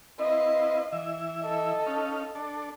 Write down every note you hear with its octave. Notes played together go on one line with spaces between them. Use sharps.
C4 E4 B4 D#5 F5
E3 E5
A4 D#5
C#4 D#4 F5
D4 A4